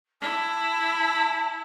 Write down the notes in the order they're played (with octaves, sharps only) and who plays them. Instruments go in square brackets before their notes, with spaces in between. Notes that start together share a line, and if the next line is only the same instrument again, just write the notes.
[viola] E4 [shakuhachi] A5